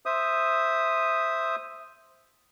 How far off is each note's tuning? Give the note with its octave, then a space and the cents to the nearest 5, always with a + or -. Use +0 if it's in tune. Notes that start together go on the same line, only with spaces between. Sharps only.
C5 +0 E5 +0 D#6 +0